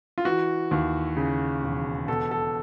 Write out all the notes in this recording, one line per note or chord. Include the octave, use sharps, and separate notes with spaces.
F4
E3 F#4
D#2
C#3
E1
B2 A4
A4